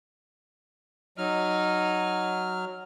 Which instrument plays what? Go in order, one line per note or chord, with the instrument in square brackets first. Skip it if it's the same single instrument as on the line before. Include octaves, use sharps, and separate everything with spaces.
[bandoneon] F#3 F6 [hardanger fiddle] D#4